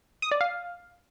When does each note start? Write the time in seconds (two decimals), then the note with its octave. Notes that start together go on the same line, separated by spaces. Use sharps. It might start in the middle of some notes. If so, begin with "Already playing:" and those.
0.22 D#6
0.31 D5
0.41 F5